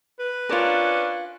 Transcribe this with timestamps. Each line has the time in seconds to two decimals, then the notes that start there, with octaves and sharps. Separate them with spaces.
0.19 B4
0.49 C#4 D4 F4 A#4